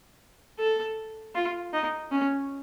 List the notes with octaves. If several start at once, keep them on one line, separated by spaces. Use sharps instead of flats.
A4
F4
D#4
C#4